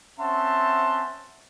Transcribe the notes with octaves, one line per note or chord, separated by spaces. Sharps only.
C4 C#4 E5 F#5 A5 C6